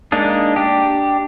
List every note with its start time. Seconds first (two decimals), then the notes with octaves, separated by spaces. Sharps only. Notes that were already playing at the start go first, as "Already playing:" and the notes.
0.12 G#3 A#3 D4 D#4
0.56 D4 G4